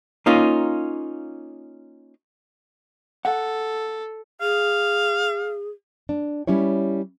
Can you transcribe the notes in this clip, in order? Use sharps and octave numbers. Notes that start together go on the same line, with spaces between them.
A#3 C#4 D#4 F4
A4 F#5
G#4 F5
D4
G3 C#4 E4 C#5